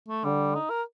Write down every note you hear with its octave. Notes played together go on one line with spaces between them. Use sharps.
A3
D3 G3
D#4
A#4